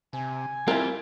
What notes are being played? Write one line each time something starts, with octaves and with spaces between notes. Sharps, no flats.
C3 G#5
G3 C4 E4 F4 A#4